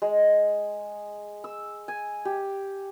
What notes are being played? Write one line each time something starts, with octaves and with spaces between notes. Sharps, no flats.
G#3
E6
G#5
G4